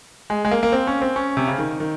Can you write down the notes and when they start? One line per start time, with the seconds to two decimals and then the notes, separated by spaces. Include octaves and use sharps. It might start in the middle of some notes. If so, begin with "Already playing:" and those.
0.30 G#3
0.45 G#3
0.52 A#3
0.63 A#3
0.72 C4
0.87 C#4
1.02 C4
1.16 C#4
1.37 C3
1.48 C#3
1.58 D#3
1.80 D#3